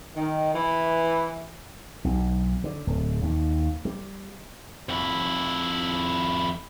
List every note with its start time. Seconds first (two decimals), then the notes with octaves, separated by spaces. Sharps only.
0.15 D#3
0.53 E3
2.05 B1
2.64 D3
2.87 D1
3.22 D#2
3.85 G3
4.89 F2 E4